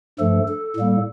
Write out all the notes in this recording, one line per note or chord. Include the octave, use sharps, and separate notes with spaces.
G2 F3 A3 A4
A4
A2 G3 A#3